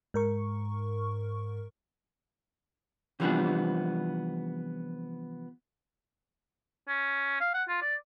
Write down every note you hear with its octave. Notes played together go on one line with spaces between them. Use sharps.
G#2 A#4 C#6
C3 E3 F3 G3 B3 D4
C#4
F5
F#5
F4
D5